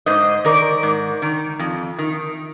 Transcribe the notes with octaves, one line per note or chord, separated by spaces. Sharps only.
G#2 C5 D#5
D#3 A#4 D5
G#2
D#3
F2
D#3